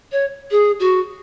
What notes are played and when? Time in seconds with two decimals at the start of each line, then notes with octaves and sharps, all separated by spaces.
0.12 C#5
0.51 G#4
0.80 F#4